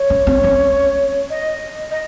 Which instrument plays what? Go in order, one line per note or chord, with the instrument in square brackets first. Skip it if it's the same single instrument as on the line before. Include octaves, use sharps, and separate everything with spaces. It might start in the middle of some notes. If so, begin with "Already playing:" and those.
Already playing: [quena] C#5
[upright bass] C#4
C4
C#4
[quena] D#5
D#5